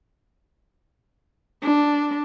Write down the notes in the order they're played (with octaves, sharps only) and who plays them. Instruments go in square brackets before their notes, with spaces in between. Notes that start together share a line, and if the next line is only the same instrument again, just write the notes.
[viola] D4